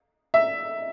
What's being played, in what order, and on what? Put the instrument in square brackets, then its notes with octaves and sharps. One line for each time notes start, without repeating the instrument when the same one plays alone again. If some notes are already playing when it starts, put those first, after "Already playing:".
[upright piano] E5